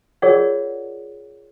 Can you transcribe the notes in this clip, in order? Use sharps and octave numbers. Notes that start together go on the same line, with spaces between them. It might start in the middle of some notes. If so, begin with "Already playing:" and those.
F4 G#4 A#4 C#5 D5 F#5